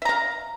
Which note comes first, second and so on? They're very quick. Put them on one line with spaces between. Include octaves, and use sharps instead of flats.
E5 A#5 F5